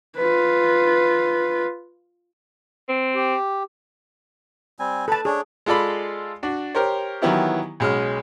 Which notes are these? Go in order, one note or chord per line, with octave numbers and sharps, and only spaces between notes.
F4 B4
C4
G4
G3 C4 G#5
A4 B4 A5 B5
D4 G#4 C#5
G#3 F4 A4 D5 B5
D4 F#4
G4 A#4 C5 C#5
D#3 E3 F#3 B3 E4 G4
B1 G#3 C#4 F6